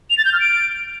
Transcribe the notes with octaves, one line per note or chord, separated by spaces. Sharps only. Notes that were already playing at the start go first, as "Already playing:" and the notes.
F7
A6
G6
F6
D7